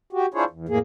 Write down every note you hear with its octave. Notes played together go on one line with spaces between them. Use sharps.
F#4 G4
D4 E4 F4 G#4 C5 C#5
E2
F2 A2 A#3 G#4